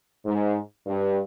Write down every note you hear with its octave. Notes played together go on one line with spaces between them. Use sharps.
G#2
G2